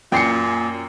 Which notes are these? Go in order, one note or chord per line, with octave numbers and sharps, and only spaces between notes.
F#2 A#2 G5 C7 C#7